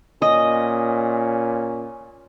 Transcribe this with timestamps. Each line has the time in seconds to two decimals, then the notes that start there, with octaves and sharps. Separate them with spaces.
0.22 A#2 C#4 D#5